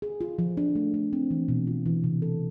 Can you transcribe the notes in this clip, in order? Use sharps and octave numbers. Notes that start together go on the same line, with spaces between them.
G#4
F4
F3
D4
A3
A3
C4
E3
B2
F4
E3
C3
A4